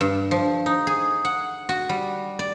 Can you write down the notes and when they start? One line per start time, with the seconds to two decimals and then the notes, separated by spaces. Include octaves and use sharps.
0.01 G2
0.31 F3
0.66 D#4
0.87 G#4
1.25 F#5
1.69 F#4
1.89 G3
2.39 D5